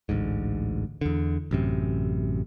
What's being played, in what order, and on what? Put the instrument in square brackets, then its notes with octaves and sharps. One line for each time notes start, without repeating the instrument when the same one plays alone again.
[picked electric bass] A1 D2 G#2
E2 D3
A1 F#2 C3